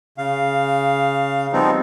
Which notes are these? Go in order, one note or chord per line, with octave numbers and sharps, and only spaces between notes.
C#3 F5
F3 G3 B3 C4 D#4